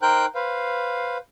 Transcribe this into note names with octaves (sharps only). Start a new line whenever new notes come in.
D#4 A#4 C5 G5 F#6 G6
B4 C5 F5